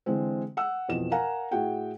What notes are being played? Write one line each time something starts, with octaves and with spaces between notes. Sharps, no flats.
D3 E3 G#3 C4
F#5 E6
F2 B2 E3 E7
A#4 F5 F#5 G#5 A#5
A2 E4 F#4 G#4 F#5 G5